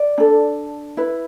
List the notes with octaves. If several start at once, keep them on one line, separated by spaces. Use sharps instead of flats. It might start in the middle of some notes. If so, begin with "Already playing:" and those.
Already playing: D5
D4 A4
E4 B4